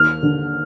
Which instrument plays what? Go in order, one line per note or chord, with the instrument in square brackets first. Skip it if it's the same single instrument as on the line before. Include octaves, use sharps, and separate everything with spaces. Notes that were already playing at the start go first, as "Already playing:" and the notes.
Already playing: [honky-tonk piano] D#2 [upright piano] F6
[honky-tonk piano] D3